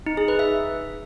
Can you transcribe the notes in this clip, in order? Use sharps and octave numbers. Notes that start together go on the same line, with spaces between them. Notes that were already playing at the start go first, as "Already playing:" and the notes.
D#4
G#4
B4
E5